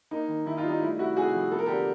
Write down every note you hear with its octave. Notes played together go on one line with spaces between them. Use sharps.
A#3 D#4
D#3
D#3 E4
D#4 F4
G3
D#4
A3 E4
C3 E4 F#4
C3 F#4 G#4
F3
B3 A4
A#4
G4 A4
D3